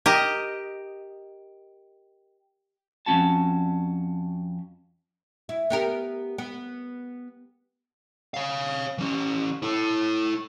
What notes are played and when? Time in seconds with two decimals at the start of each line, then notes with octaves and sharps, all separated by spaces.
0.06 G4 A#4 D#5
3.06 F2 C4 C#4 F#4 A5
5.49 E4
5.70 B3 G4 A#4
6.38 B3
8.34 C#5 F5
8.98 E3 C#4
9.62 E4 A4